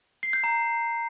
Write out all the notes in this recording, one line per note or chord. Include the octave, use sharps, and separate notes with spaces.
C7
G6
A#5